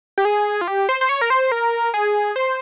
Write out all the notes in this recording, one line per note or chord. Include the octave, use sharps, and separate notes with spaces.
G4
G#4
F4
G4
C5
C5
C#5
A#4
C5
A#4
G#4
C5